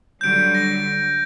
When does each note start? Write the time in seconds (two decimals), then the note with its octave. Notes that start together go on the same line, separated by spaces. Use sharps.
0.21 D3 F#3 G3 G6 D7
0.55 A#6